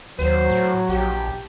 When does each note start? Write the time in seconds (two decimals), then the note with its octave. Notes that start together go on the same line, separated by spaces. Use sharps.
0.19 D#2 F#3 C5
0.50 A2
0.89 A#1 G4